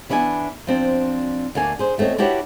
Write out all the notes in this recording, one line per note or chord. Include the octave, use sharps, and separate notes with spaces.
E3 B3 D4 E5 G#5
F3 C4 D4
D2 A#3 D4 G#5
G#4 C5
E2 A3 C4 C#5 D#5
D4 E4 F#4 G4 B4 C#5